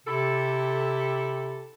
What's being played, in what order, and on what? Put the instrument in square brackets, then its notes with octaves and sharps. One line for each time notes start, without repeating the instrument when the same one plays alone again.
[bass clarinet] C3 [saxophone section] E4 G4 A4